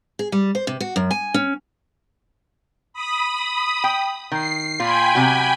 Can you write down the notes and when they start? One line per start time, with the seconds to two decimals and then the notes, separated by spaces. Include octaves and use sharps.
0.19 G#4
0.32 G3
0.55 C5
0.67 C3
0.81 F#4
0.96 F#2
1.11 G#5
1.34 C#4
2.93 B5 D#6
3.84 G5
4.32 D#3 C7
4.79 A#2 F4 G5 G#5 B5
5.15 C3 F#3 F#4